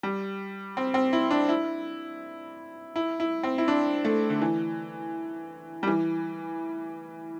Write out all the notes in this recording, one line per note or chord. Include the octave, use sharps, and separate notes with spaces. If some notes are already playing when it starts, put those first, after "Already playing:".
G3
C4
C4
E4
D4
E4
E4
E4
C4
E4
D4
A3
D3
E3
G3
E3